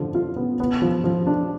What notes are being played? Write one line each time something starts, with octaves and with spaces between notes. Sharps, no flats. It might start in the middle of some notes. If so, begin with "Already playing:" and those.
Already playing: D3 F3
F4
B3
B3
F3
F3
D4